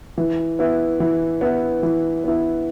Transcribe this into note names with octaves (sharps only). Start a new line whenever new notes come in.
E3
B3 E4
E3
B3 E4
E3
B3 E4